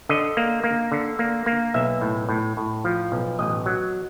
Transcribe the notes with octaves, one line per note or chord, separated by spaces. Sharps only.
D3 D#5
A#3
A#3
D3
A#3
A#3
B1 E5
A2
A2
A2
F3
B1
A1 D#5
F#3